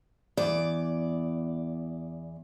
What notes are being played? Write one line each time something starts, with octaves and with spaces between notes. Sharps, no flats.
E2 D5